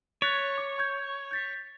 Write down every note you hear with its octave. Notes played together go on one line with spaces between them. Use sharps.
C#5 F#6 A6 B6
D6
C#6 G6 G#6
G6 A6 B6